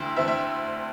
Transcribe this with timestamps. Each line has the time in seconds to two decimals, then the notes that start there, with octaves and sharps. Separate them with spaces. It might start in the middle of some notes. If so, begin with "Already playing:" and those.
Already playing: D2 D3 E4 G5
0.16 D2 D3 C4 E4 E5
0.28 E5